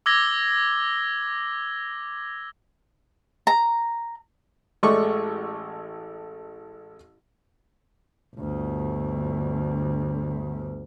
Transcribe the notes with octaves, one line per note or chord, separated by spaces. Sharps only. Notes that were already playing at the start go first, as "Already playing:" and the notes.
D6 E6 G#6 A#6 G7
A#5
A1 G#3 A3 D5 C#6 D6
G1 D2